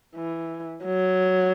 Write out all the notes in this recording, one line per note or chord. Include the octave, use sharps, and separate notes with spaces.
E3
F#3